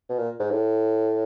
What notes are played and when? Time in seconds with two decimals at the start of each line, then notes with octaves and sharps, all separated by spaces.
0.09 B2
0.19 A#2
0.40 G#2
0.51 A2